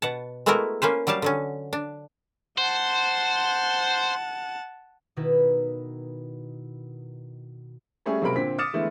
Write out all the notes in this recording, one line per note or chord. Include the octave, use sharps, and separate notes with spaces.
B2 F#5 A5
G#3 A3 B3 E4 F#4 A#4
A#3 C#4 B4 C5
F#3 G3 G4 F5 A5
D3 F#3 C#4
D4
C5 F#5 A5
B2 D#3 D#4 E4 B4
G3 A3 C#4 G#4
B1 C3 G#3 A#4 B5 D7
A#2 D3 C4 B6
D6 D#6 F6 A6 C#7 E7
D3 E3 G#3 A3 B3